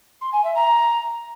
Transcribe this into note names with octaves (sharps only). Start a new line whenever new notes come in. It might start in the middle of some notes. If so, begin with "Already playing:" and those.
C6
G#5
E5
A#5